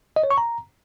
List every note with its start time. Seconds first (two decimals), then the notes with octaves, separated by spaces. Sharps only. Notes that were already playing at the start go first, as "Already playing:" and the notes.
0.16 D#5
0.23 C#5
0.31 C#6
0.38 A#5